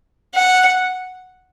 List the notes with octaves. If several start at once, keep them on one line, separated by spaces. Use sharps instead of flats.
F#5